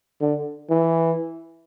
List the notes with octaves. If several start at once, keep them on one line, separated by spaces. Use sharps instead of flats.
D3
E3